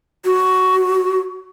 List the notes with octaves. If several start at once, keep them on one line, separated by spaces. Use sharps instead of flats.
F#4